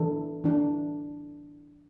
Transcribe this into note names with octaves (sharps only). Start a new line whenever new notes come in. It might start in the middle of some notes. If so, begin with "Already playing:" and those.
Already playing: E3 D4 A4
E3 D4 A4